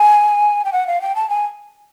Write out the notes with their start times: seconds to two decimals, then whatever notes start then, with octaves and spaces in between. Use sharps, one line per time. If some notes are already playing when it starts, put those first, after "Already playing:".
Already playing: G#5
0.65 G5
0.73 F#5
0.87 F5
1.01 G5
1.15 A5
1.29 G#5